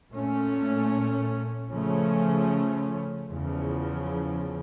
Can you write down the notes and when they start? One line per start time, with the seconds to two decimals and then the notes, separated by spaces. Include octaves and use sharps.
0.12 A#2 A3 C#4
1.71 C#3 F3 A3 C#4
3.30 E2 C#3 F3